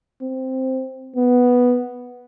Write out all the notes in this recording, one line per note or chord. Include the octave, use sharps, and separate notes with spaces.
C4
B3